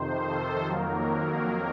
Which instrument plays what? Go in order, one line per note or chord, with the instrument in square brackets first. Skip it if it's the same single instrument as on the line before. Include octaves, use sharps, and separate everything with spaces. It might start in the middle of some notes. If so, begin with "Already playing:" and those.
Already playing: [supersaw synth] F2 C3 D#3 C5
A4
F2 D#3 F#3 A#3 A#4
A#4